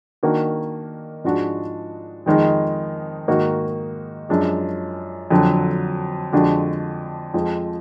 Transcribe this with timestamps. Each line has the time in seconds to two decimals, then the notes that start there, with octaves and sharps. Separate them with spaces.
0.23 D#3 A#3 D4 F#4
1.24 G#2 F3 G#3 D4 F#4
2.26 F2 D#3 G#3 D#4
3.28 G#2 D#3 A#3 D#4 F#4
4.29 F#2 F3 G#3 D4 G#4
5.30 F2 D3 F#3
6.33 F2 D3 G#3 D4 F#4
7.34 F2 F3 G#3